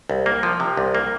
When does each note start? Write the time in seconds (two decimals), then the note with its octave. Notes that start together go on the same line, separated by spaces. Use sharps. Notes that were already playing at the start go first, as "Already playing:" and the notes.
0.10 C2
0.26 A#3
0.43 F3
0.60 C3
0.77 C2
0.95 A#3